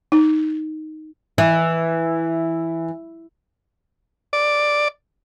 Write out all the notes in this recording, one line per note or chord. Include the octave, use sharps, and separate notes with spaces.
D#4
E3 E5
D5